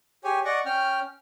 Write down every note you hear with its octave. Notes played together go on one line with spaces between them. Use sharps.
G4 G#4 C#5 G#5
D5 D#5 F#5 C#6
C#4 G5 F6